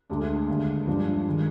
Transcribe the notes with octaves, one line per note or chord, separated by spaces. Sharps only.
D2 D3 G#3 D4
D#2 D3 G#3
G2 F3 G#3 D4
D#3 G#3